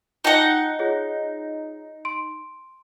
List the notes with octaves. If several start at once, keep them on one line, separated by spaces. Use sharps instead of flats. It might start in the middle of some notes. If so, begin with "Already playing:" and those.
D#4 F4 F#5 G5 A5
F4 G#4 C#5
C6 D7